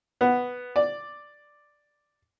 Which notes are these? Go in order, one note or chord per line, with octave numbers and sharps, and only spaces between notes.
B3
D5